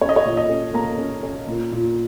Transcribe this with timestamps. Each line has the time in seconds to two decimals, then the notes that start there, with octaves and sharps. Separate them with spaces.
0.01 C#4 C#5
0.09 D#5
0.16 C#5
0.25 A#2
0.37 D#5
0.49 C#4
0.74 A#3 A#5
0.99 C#4
1.23 C#4
1.47 A#2
1.72 A#2